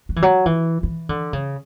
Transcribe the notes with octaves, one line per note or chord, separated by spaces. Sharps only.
F#3
E3
F#3
E3
E3
D3
C#3